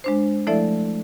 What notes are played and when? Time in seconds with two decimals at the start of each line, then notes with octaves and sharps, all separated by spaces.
0.04 G#3 D4 C5
0.47 F3 A3 E4 A4 D5 E5